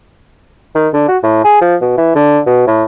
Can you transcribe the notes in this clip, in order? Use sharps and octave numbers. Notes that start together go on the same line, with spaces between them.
D#3
D3
F#4
A2
G#4
F3
B2
E3
D3
B2
A2